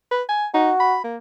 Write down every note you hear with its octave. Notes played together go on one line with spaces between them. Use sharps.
B4
G#5
D#4 F#4
B5
A#3